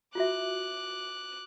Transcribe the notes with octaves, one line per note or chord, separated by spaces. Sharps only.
F4 F#4 E5 D6 F#6